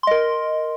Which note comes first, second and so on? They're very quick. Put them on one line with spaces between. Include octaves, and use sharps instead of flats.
C6 D#5 A#4